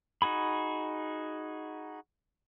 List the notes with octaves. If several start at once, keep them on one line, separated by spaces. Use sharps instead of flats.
D#4 F#4 G#4 B5